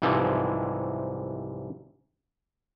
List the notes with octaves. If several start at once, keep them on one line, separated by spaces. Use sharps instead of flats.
C2 G#2 C3 E3 F3